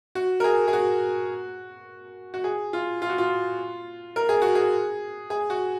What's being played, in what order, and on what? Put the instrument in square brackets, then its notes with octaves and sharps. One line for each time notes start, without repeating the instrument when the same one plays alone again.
[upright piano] F#4
A#4
G#4
G#4
F#4
F#4
G#4
F4
F4
F#4
F4
A#4
G#4
F#4
G#4
G#4
F#4